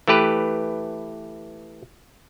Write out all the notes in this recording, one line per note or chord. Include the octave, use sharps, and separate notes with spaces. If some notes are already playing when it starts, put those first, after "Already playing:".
E3 A3 G4 B4